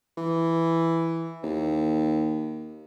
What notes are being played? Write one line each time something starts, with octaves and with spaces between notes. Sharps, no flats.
E3
D#2